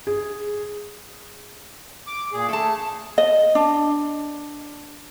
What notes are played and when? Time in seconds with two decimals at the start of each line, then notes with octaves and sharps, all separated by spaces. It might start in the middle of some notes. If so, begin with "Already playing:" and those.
0.07 G#4
2.07 D6
2.32 A#2 G#4
2.49 A3 A4 A5
3.18 D#5
3.55 D4